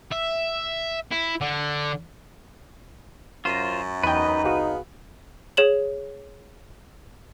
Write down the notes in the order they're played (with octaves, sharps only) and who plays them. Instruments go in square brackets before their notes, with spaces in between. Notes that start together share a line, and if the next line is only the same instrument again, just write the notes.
[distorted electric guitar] E5
E4
D3
[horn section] F#2 [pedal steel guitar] F4 C5 [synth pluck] A#6 D#7
[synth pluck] E2 G5 [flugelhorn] D#4 [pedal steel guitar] B4 D#5
[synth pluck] C2 F#4 [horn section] B3 G#4 F5
[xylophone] G#4 C#5 E7 F#7